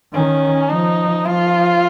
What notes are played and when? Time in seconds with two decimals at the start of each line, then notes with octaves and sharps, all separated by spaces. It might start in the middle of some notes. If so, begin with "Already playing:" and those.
0.14 D#3 C#4
0.69 F3 D#4
1.24 F3 F4